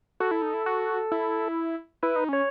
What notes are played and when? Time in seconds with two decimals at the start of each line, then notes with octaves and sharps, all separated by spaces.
0.20 F#4 A4
0.31 E4
0.42 D#4
0.54 E4
0.66 F#4
1.12 E4
2.03 E4 B4
2.16 D#4
2.29 C#4 C#5